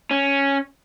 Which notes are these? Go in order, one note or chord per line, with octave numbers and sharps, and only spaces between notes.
C#4